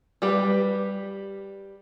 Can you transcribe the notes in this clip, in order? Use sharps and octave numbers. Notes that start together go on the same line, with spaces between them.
G3 G4 B4